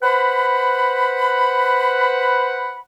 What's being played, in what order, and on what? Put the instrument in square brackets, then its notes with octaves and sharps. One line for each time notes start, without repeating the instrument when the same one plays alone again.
[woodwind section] B4 C5 F#5 B5